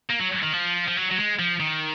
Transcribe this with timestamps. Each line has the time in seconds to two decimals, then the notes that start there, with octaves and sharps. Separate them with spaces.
0.10 A#3
0.21 F#3
0.43 D#3
0.53 F3
0.88 F3
0.97 F#3
1.11 F#3
1.18 G#3
1.39 F3
1.60 D#3